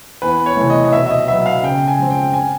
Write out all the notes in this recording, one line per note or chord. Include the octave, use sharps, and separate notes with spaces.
E2 B4
C#5
C3 E3 A3
D#5
D#5
B2 E5
E5
D#5
F#3 B3 E5
F5
C#3 G5
G#5
F3 G#3 C4
G5
G#5